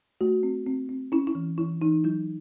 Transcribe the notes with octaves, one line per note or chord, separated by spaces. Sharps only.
A3 F#4
C4
C4
C4
C#4 E4
E4
E3
E3 E4
E3 D#4
F#3 E4